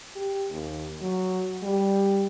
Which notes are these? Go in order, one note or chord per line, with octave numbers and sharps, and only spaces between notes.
G4
D#2
F#3
G3